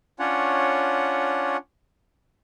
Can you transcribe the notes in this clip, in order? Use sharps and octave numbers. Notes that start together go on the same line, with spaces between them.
C#4 D4 F4 C#5 F#5